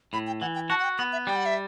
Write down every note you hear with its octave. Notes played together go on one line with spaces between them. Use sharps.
A2 B5
G5
E3 F#5
G5
F#4 A5
F#5
G5
B3 F#5
E5
G3 G5
F#5
E5